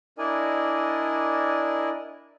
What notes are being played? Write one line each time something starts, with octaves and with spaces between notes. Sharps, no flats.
D4 E4 A#4 D5 D#5 G#5